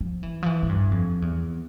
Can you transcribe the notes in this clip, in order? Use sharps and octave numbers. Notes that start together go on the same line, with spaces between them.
F3
E3
F3
E3
A2
G2
F2
E2